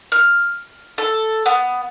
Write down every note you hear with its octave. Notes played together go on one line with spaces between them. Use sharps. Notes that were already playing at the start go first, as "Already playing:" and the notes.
F6
A4
B3